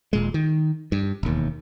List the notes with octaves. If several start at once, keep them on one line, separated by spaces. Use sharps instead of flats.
D#1 A#2 G#3
D#3
G2
E1 D#2